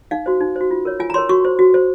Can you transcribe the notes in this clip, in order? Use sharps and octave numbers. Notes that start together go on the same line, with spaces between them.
D#4 F5
F#4 C5
D#4
F#4 C5
F4
A#4 C#5
F4 G#5
A#5
A#4 C#5 C6
F#4 C#6
C5
F#4
C5